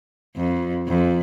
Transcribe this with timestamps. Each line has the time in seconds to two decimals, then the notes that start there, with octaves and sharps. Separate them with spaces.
0.36 F2
0.88 F2